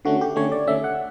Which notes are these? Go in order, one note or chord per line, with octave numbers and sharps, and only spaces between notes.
D3 A3 C#4 F#4
G4
D3 A3 C#4 C#5
D5
D3 A3 C#4 E5
F#5